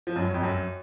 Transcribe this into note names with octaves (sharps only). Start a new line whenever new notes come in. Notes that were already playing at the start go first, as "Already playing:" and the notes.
F3
F#2
F#3
F2
F#2